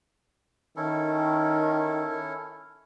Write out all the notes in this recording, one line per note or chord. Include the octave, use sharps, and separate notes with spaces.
D#3 C#4 E4 A4